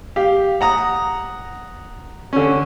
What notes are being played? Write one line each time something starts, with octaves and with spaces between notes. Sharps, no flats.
G4 F5
F#5 A#5 D#6
D3 C#4